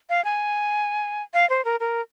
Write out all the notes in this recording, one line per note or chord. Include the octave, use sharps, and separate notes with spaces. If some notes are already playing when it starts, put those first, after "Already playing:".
F5
G#5
F5
C5
A#4
A#4